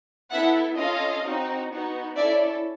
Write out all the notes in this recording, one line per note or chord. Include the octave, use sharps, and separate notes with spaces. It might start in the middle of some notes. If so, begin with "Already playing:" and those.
B3 E4 A4 E5 F#5
C#4 F4 A4 D#5 F5
C4 D#4 F#4
B3 D#4 F#4
C#4 E4 A4 D5 E5